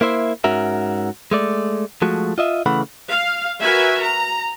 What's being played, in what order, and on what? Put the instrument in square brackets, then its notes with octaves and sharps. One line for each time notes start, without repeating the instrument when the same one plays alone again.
[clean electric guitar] A#3 E4 C5 E5
G#2 C#4 F#4 A#4 E5
G#3 A3 D5
F3 G#3 A3 F#4
F4 D#5 E5
C#3 E3 A3 F#5 B5
[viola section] F5
F#4 A#4 B4 E5 G#5
A#5